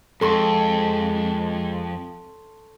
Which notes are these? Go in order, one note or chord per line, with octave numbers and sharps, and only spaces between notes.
F2 G#3 A4 A5 C6 C#6